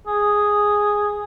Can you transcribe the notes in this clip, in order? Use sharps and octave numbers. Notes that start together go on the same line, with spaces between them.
G#4